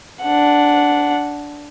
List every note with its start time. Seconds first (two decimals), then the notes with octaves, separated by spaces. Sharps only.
0.22 D4 F#5